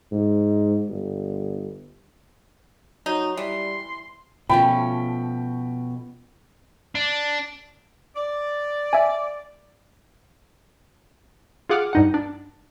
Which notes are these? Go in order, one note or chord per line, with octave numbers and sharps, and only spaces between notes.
G#2
G1
F#3 D#4
E3 G3 C6
B2 F3 A3 C#4 G5 B5
D4
D5
E5 G#5
F4 G#4 F#5 D6 F6
G2 D#4 F#5
D4